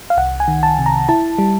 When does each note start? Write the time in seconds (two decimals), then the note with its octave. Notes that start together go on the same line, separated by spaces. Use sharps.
0.10 F5
0.17 C2 F#5
0.40 G#5
0.48 D#3
0.63 A5
0.79 C3
0.86 A#5
1.09 E4 A5
1.39 G3